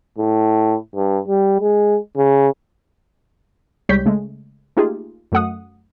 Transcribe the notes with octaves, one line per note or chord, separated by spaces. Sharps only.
A2
G2
G3
G#3
C#3
C2 G3 G#3 C#5 G6 B6
C#3 G#3 A3
A3 A#3 D#4 F4 G4 G#4
F#2 A3 F#5 D#6